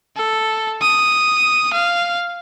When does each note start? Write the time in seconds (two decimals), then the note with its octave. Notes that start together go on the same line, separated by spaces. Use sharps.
0.16 A4
0.82 D#6
1.73 F5